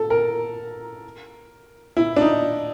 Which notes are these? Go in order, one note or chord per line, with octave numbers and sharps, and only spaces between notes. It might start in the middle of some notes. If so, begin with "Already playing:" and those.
Already playing: A4
A#4
E4
D4
D#4